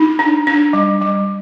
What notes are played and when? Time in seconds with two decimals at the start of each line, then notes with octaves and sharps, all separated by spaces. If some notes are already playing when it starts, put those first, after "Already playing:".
Already playing: D#4
0.19 D4
0.47 D4
0.73 G3
1.01 G3